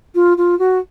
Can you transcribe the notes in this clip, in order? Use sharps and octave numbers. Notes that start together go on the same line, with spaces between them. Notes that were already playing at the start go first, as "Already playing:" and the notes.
F4
F4
F#4